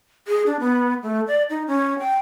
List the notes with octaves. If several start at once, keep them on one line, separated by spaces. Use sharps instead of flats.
G#4
D4
B3
A3
D5
D#4
C#4
G5